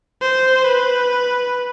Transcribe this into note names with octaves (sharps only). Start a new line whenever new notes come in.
C5
B4